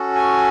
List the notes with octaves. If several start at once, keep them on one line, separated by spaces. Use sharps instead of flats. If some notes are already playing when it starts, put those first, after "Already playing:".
Already playing: C#4 F#4 A4
G#5